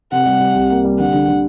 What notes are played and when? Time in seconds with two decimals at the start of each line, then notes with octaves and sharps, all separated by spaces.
0.12 C3 F#5
0.26 G3
0.40 G3
0.55 C2
0.70 A#3
0.84 G3
0.99 D3 F#5
1.14 D3
1.28 D3